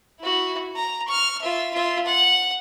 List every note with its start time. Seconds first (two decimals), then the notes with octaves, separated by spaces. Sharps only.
0.20 E4 F#4
0.76 A#5
1.08 C#6 F6
1.41 F4 E5
1.73 F4 E5
2.06 F#5